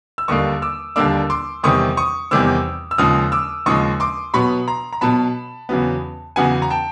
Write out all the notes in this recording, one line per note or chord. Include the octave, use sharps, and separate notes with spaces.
E6
D#2 D3 G3 A#3 D4 C#6 D#6
D6 E6
D#2 D3 G3 A#3 D4 D6 E6
C6 D6
E2 C3 D#3 G3 C4 C#6 D#6
C#6 D#6
E2 C3 D#3 G3 C4 D6 E6
E6
D#2 C#3 F3 G#3 D#6 F6
D6 E6
D#2 C#3 F3 G#3 C#6 D#6
C6 D6
B2 F#3 B3 B5 C#6
A#5 C6
A#5
B2 F#3 B3 A5 B5
E2 C#3 F#3 B3
E2 C#3 F#3 B3 F#5 G#5
A#5
G5 A5